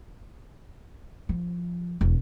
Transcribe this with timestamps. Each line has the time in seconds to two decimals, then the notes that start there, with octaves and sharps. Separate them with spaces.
1.29 F3
2.01 E1